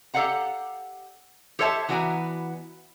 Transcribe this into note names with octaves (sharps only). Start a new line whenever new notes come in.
G4 A4 D5 F5 F#5 A#5
G4 A4 C5 C#5 E5 A5
E3 B3 F#4 D5 G#5 A#5